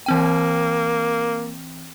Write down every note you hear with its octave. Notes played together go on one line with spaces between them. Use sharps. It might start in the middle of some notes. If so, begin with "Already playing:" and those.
E3 A#3 C4 G5